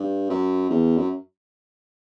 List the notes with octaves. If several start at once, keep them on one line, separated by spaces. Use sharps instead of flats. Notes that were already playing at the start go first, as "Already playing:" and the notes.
Already playing: G2
F#2
E2
F#2